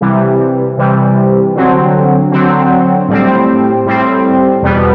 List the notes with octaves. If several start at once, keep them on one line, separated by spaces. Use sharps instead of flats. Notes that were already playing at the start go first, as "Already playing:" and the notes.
C3 E3 G3
C3 E3 G3
D3 F#3 C4
D3 F#3 C4
A2 G3 C4
A2 G3 C4
E2 B2 G3 B3